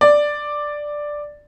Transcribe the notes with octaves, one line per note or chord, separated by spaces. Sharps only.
D5